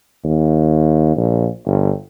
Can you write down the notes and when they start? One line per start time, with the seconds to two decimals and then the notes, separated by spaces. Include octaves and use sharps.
0.24 D#2
1.17 A#1
1.66 G1